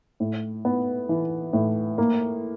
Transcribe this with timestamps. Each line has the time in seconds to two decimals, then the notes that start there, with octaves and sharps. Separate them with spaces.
0.20 A2
0.65 B3
1.09 E3
1.53 A2
1.98 A#3